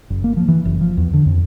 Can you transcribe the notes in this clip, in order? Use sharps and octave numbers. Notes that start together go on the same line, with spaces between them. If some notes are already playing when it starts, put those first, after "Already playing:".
F#1
A#3
F3
E3
F#1
F3
E2
D3
F2